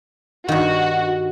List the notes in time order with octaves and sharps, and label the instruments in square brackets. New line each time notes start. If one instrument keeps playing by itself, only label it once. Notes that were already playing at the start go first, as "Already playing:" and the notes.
[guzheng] G2 D#3 [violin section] F#4